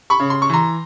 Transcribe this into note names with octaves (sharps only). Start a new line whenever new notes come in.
B5 C#6
C#3
C6
C#6
E3 A#5 C6